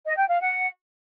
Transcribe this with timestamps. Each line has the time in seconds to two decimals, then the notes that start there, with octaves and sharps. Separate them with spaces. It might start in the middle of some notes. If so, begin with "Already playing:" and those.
0.05 D#5
0.17 G5
0.28 F5
0.40 F#5